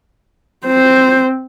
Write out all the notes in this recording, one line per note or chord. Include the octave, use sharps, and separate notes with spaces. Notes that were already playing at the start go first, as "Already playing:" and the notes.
C4 C5